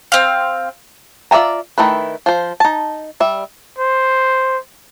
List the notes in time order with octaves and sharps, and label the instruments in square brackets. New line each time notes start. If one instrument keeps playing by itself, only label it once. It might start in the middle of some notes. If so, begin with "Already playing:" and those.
[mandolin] C4 F5
[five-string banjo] F4 D5 E5 G#5 A#5
D#3 A3 E4 B4
F3 C5
D#4 A5
G3 E5
[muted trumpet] C5